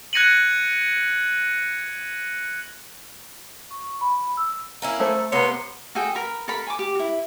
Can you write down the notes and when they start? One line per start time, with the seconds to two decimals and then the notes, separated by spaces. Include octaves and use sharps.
0.13 F#6 G#6 A#6 C#7 D#7 F#7
3.71 C#6
4.01 B5
4.37 E6
4.82 A#3 C#4 E4
5.00 A3 A4 C5
5.32 C3 A#3 B3 C#5 C6
5.95 F#4 G#4 A4 G5
6.15 A#4 B5
6.48 A4 A#4 A#5 B5
6.67 G#5 C6 D6
6.78 G4 D6
6.95 E4 F#4